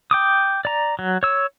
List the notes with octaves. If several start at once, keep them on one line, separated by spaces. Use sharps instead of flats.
G5 D6 D#6
D5 A#5
F#3
C#5 E6